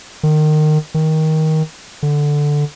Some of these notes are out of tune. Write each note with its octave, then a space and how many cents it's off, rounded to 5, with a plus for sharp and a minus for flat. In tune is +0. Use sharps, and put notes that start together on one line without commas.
D#3 -25
D#3 +15
D3 +0